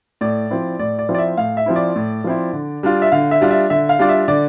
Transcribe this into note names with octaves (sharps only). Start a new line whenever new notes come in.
A2 D5
F3 C4 E4
A2 D5
D5
F3 C4 E4
D5
E5
A2 F5
E5
F3 C4 E4
D5
A2
F3 C4 E4
D3
G3 D4 F4
E5
D3 F5
E5
G3 D4 F4
E5
D3 E5
F5
G3 D4 F4 D5
E5
D3 D5